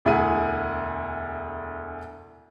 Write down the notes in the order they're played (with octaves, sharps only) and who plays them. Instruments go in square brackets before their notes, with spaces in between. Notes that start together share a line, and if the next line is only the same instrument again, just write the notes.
[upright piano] E1 D2 E4 G#4 F#5 D#7